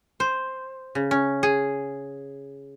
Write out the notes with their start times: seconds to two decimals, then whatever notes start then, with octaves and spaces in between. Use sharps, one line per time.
0.20 C5
0.95 C#3
1.11 C#4
1.43 G#4